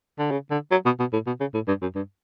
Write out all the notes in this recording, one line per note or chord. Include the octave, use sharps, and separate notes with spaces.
D3
C#3
D3
F#3
B2
B2
A2
B2
C#3
A2
G2
F#2
G2